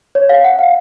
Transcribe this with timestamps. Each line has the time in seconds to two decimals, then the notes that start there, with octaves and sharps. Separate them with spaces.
0.15 C#5
0.29 F5
0.44 F#5
0.59 F5